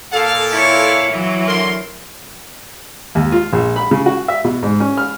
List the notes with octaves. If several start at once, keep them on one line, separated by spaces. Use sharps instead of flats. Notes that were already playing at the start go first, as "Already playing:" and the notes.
A#2 A4 F5
E4 C#5
E3 F#3
D3 A#4 C6
D#2
F4
A#1
B5
C#3
F#4
E5
B2
G#2
C#4
F6